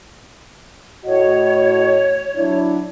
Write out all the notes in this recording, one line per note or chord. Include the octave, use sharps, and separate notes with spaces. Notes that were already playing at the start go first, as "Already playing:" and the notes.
A2 F#4 C#5 D#5
F#3 D4 E4